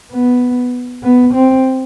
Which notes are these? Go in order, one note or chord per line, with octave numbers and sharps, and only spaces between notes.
B3
B3
C4